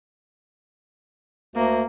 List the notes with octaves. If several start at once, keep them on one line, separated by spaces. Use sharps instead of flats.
D2 A#3